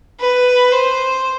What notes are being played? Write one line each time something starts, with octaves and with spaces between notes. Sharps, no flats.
B4
C5